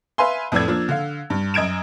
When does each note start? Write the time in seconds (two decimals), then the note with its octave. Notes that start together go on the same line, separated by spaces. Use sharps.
0.18 B4 E5 F5 G#5 C6
0.52 F2 A2 B4 D5 E6 G#6
0.68 F3 A#3 D4
0.89 D3 F5
1.30 G2
1.54 F#2 D#5 G#6 D7 E7